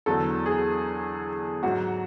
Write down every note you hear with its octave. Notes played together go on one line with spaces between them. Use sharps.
E2 D3 F#3 A4
G#4
G#2 F#3 F#4